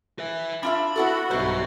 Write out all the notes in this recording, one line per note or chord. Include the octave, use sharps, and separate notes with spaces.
B4 E5
D4 F4 E5 B5
B3 E4 F#4 A4
B1 G2 B4 C5 E5